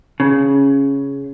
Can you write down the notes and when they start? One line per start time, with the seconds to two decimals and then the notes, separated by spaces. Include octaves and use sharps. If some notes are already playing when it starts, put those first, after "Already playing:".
0.20 C#3